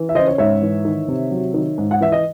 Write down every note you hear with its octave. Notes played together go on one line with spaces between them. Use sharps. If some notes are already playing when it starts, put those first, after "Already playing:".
Already playing: E3
E5
C#3 C5 D#5
C#5
G#2 C#5 E5
E3
D#3
C3
F#3
D#3
G#2
F#5
E3 E5
D#5